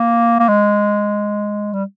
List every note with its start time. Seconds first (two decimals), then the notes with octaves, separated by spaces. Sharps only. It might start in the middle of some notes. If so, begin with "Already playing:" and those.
Already playing: A#3
0.39 A#3
0.49 G#3
1.73 G3